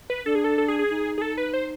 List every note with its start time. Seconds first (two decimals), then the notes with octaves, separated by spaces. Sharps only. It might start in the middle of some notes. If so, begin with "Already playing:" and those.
0.10 B4
0.26 D4 A4
0.35 G#4
0.44 A4
0.58 A4
0.68 G#4
0.79 G#4
0.90 D#4
1.18 G#4
1.22 A4
1.37 B4
1.53 C5